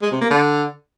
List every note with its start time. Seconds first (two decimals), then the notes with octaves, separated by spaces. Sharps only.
0.02 G#3
0.11 C3
0.21 A#3
0.30 D3